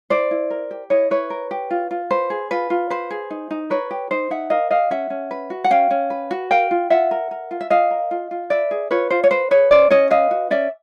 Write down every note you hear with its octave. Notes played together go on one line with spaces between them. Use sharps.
E4 C5 D5
E4
A#4
G4
E4 C#5 D#5
E4 B4 C#5
A#4
G4
F4
F4
B4 C5
G#4
F4 B4
F4
B4 C5
G#4
D#4
D#4
A#4 B4 C#5
G4
D#4 C5
D#4 E5 F#5
A#4 D#5 F5
G4 D#5 F5
C#4 E5 F#5
C#4
B4
F#4
F#5
C#4 F5 G5
C#4
B4
F#4
A#4 F5 G5
F4
F4 E5 F#5
A#4
A#4
F4
E5
F4 D#5 F5
A#4
F4
F4
B4 D5 E5
G#4
F4 B4 C#5
F4 C5
C#5
B4 C5
G#4 B4 C#5
C#4 C5 D5
C#4 C#5 D#5
B4 D#5 F5
F#4
C#4 D5 E5